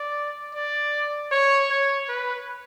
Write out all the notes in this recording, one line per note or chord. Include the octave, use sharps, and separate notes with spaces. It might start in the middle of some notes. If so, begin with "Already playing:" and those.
Already playing: D5
D5
C#5
C#5
B4